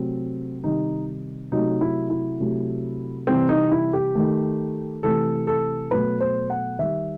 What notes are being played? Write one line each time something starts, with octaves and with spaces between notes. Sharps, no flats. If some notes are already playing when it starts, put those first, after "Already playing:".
Already playing: C3 F#3 A3 C4
C3 D#3 G3 D#4
C3 F#3 A3 D#4
E4
E4
C3 F#3 A3
C3 E3 G3 C4
D#4
E4
G4
D#3 A3
C3 E3 A3 A4
A4
B2 F#3 A3 B4
C5
F#5
D#3 G3 E5